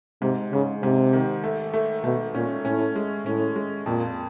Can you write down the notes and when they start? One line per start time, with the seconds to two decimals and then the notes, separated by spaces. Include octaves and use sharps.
0.22 G#2 C3
0.53 G#2 C#3
0.83 G#2 C3
1.13 D#3
1.44 A3
1.74 A3
2.04 B2 A3
2.34 A#2 C#4
2.65 A2 C#4
2.96 G#3
3.26 A2 C#4
3.56 G#3
3.86 F2 A#2